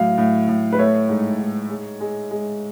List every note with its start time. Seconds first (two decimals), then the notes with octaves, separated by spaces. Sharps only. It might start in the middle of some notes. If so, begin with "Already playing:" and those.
Already playing: A2 F#3 F5
0.18 A2
0.48 A2
0.72 B4
0.79 A3 C#5
1.09 G#2
1.39 G#2
1.70 G#3
2.00 G#3
2.31 G#3